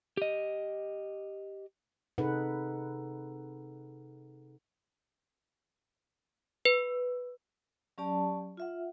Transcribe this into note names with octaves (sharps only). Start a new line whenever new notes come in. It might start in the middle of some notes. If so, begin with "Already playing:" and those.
G4 D#5
C3 D#4 G#4 A4 B4 F#5
B4
F#3 C#4 G4 D5 A5
F4 E5 F#5